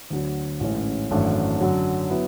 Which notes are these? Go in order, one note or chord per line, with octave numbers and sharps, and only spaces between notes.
D2 D3 F#3
A1 G#2 E3 A3 C#4
G#1 F#2 E3 A3 D4
F#2 D3 F#3
F#3 B3 E4